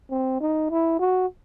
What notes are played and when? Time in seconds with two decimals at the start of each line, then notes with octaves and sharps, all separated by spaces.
0.11 C4
0.41 D#4
0.70 E4
1.00 F#4